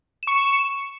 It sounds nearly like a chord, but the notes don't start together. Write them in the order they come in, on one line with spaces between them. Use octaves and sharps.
E7 C#6 C#7